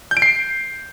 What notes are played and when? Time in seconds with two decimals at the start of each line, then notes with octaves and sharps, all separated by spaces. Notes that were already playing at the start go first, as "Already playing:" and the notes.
0.11 G6
0.17 D7
0.22 C7